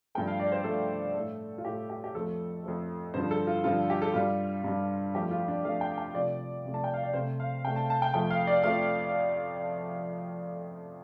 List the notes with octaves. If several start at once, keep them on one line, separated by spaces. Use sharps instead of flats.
G2 F3 A3 G5
F5
D5
C5
G2 F3 A3 A4
A2 A3
F4
A2 A3 G4
G4
G4
F2 F3 A3 A4
F2 F3 A3
G2 D3 F3 C5
A4
F4
G2 D3 F3 F4
G4
A4
G2 G3 F4
G2 G3
F2 F3 A3 G4
F4
D4
F2 F3 A3 F5
G5
G5
C3 F3 A3 D5
C3 F3 A3
A5
G5
F5
D5
C3 A3 C5
F5
C3 A3 G5
A5
A5
G5
F2 F3 A3 G5
F5
D5
F2 F3 A3 F5